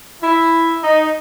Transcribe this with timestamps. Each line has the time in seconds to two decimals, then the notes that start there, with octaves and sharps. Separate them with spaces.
0.23 E4
0.82 D#4